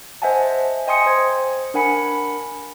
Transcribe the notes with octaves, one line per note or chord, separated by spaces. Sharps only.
C5 D#5 E5 F#5 G#5 A5
D#5 G5 G#5 C6 D#6 C#7
C5 G#6
D4 A#4 F#5 G#5 B5 C#7